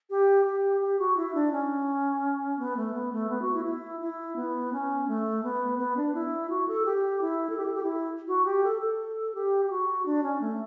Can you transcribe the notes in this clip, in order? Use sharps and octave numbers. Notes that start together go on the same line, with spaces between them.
G4
G4
G4
F#4
E4
D4
C#4
B3
A3
B3
A3
B3
F#4
E4
E4
E4
B3
C#4
A3
B3
B3
D4
E4
F#4
A4
G4
E4
A4
G4
A4
G4
E4
F#4
G4
A4
A4
G4
G4
F#4
D4
C#4
A3